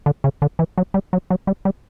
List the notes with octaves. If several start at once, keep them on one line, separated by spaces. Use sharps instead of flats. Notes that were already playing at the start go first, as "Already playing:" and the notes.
D3
C#3
D3
E3
F#3
G3
F#3
F#3
G3
G3